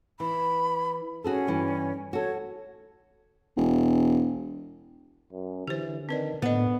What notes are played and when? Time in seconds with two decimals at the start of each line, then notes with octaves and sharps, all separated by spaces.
0.20 E3 B5
1.24 C#4 F#4 G#4 A4
1.47 G2 E3
2.13 F#4 A4 C#5
3.57 E1
5.32 F#2
5.68 D3 E3 G4 C5
6.09 D#3 C4 B4 D5
6.42 A2 D3 B3 C5 D#5